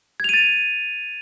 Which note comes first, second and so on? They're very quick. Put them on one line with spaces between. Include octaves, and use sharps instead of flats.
G#6 F7 D#7 A6